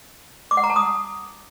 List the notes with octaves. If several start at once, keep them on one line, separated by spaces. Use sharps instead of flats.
D6
F#5
A#5
A5
D#6